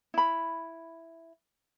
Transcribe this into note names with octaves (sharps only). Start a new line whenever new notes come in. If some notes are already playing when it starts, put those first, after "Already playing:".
E4 B5